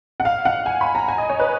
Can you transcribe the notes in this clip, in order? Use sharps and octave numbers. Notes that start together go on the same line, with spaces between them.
F#5
F5
F#5
G#5
B5
A#5
G#5
D#5
C#5
B4